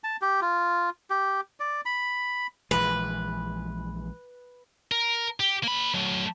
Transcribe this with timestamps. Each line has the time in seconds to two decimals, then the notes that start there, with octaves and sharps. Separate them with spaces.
0.04 A5
0.22 G4
0.41 F4
1.10 G4
1.60 D5
1.85 B5
2.71 A#1 E3 G#3 B4
4.92 A#4
5.40 G4
5.63 A#3 B5
5.94 F#3 A3